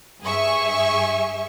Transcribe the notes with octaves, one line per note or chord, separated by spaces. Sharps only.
G2 G#4 E5 C#6